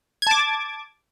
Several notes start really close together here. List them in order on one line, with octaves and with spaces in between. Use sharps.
G#6 A5 D6